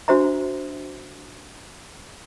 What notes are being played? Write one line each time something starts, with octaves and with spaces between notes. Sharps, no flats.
D4 F#4 C5 E5 A#5